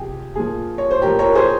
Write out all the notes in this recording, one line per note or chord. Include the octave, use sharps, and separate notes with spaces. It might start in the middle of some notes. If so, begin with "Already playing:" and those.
Already playing: C3 F3 G4 G#4
A#2 F3 G#4
C#5
C5
A#2 F3 G4 A#4
A#4 C#5
G#4 C5